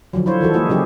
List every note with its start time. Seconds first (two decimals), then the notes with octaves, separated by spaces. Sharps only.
0.13 D3 F3 F#3
0.26 E4 F4 C5 C#5
0.41 D#3 E3 F#4 A4
0.53 G#3 A#3 E4 F#4 G#4
0.69 C#3 F#3 E4 G4 G#4